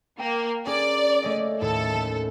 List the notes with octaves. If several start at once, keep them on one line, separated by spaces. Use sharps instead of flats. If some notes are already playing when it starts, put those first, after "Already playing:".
A#3 G5
C#4 G#4 A#4 D5
A3 C#4 D#5
D#2 A2 A4
A3